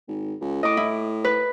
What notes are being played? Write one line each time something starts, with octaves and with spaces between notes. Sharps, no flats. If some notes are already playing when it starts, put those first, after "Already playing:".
G#1
C#2
A2 D#5 D6
E4
B4